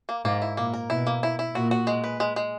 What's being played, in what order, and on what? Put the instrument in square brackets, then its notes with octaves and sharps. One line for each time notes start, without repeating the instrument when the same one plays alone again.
[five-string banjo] A#3
[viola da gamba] G#2 [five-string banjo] A#3
[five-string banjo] E4
[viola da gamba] A#2 [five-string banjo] A#3
[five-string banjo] A#4
[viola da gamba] B2 [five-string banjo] E4
[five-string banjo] A#3
E4
E4
[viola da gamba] A#2 [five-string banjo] F#4
[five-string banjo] F#4
G#3
B4
G#3
G#3